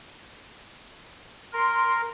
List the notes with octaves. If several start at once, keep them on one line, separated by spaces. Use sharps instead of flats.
A#4 C6